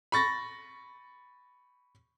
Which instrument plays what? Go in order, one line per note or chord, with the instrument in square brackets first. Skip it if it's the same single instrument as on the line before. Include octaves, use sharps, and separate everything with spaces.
[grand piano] B5 C#6 A6 A#6